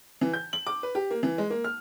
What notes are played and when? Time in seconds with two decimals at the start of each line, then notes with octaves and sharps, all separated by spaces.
0.21 E3
0.33 G6
0.53 F#7
0.67 D6
0.83 B4
0.95 G4
1.11 A#3
1.23 E3
1.38 G#3
1.50 A#3
1.64 F6